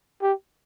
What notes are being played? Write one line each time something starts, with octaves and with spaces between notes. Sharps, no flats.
G4